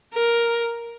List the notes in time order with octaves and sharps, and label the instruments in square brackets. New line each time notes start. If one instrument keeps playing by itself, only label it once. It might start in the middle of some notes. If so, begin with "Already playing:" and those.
[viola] A#4